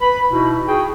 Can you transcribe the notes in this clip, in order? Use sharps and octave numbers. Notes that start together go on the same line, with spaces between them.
B4 B5
B2 D#4 E4
F#4 G#4 G5